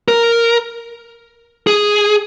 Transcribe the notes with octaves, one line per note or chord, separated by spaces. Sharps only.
A#4
G#4